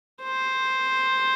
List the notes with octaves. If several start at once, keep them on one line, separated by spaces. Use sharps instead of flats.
C5